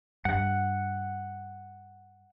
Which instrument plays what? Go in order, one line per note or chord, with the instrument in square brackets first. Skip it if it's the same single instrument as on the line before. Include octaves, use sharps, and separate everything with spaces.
[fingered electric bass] G2 [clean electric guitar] F#5